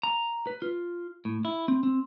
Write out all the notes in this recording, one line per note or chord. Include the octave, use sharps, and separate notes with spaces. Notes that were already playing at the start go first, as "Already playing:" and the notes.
A#5
B4
F4
A2
E4
C4
C4